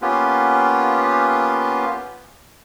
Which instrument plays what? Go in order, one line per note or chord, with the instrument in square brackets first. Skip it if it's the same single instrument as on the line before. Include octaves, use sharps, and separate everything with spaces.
[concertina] A#3 B3 C#4 F4 G4 B4